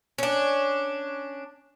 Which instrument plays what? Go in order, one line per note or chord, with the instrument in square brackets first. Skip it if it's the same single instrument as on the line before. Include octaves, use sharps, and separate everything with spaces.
[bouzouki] C#4 D4